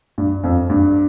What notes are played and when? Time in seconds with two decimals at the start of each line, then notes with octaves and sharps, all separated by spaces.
0.18 G2
0.44 F2
0.70 G2